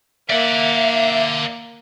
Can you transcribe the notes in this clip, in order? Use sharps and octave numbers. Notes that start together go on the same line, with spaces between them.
A#3 D5 E5 F#5